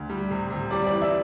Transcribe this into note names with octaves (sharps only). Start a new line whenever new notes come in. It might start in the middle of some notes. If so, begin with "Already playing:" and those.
Already playing: D2
G3
C3
C3
G3 D5
D5
E3
E5